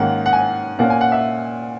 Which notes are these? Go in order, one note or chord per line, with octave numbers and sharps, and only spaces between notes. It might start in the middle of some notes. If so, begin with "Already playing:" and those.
Already playing: G#2 D#3 A#3 C#4 F#5
F#5
G#5
A#2 A#3 C#4 F#5
G#5
F#5
E5